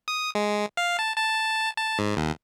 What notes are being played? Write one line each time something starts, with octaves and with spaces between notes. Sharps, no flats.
D#6
G#3
F5
A5
A5
A5
G#2
D#2